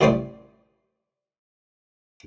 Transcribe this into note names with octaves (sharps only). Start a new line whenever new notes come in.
A1 G3 A3 C5 D5 D#6